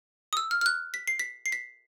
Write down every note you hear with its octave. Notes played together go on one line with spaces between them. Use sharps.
D#6
E6
F6
F6
F#6
B6
C7
B6
C7
B6